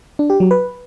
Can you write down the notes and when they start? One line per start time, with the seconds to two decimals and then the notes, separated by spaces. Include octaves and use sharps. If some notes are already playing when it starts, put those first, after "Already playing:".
0.19 D4
0.30 G4
0.40 F#3
0.51 B4